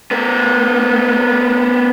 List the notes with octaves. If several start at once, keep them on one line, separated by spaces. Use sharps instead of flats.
B3 A#4